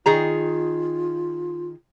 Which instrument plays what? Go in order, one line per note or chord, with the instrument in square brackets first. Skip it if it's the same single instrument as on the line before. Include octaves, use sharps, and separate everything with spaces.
[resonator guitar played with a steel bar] D#3 G#4 A#5 [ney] F4